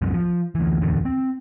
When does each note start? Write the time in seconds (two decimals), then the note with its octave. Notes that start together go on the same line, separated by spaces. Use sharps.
0.01 C2 F#2 C3
0.14 F3
0.55 D2 E3
0.82 D1 E2 D3
1.05 C4